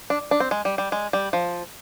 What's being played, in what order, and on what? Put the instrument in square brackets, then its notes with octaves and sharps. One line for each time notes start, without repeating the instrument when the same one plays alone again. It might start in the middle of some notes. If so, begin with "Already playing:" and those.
[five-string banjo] D4
D4
C4
G#3
G3
G3
G#3
G3
F3